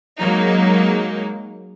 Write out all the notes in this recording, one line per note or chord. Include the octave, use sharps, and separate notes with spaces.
F#3 G#3 A#3 D#4